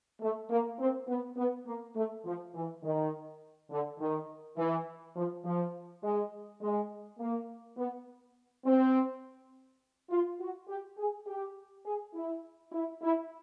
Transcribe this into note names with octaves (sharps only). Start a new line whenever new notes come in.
A3
A#3
C4
B3
B3
A#3
A3
F3
E3
D#3
D3
D#3
E3
F3
F3
G#3
G#3
A#3
B3
C4
F4
F#4
G4
G#4
G4
G#4
E4
E4
E4